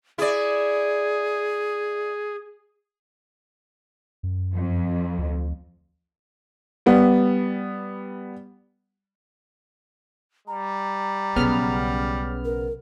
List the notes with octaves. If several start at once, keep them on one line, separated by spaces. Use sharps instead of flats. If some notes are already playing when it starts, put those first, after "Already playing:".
E4 G#4 D5
F#2
F2
D2
G3 B3
G3 A#5
B1 C#3 G#3 B3 F6
A#4